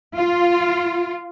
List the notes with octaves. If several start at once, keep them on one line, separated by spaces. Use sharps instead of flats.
F4